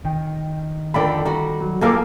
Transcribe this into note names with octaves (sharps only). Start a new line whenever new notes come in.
D#3 G5
F2 D3 A#4 D5 G5 B5
G3 F#4 A#5
F#3
F2 A#3 G#4 A4 F5 D6